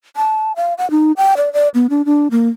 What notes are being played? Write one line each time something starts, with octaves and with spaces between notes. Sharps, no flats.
A5
F5
F#5
D#4
G5
D5
D5
B3
D4
D4
A#3